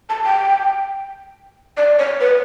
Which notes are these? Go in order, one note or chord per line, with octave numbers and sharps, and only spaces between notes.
A5
G5
D5
C#5
B4